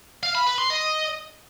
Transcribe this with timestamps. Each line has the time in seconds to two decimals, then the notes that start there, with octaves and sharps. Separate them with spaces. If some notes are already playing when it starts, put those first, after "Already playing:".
0.23 F5
0.35 B5
0.47 B4
0.58 C6
0.70 D#5